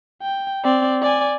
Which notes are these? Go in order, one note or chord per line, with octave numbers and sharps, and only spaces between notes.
G5
C4 D5
D5 G#5